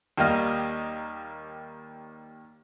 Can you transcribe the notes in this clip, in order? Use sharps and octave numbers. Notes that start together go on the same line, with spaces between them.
D#2 G3 A#3 D#5 F6